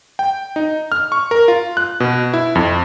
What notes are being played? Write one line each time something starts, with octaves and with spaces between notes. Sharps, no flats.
G5
D#4
F6
C#6
A#4
F4
F#6
B2
E4
F2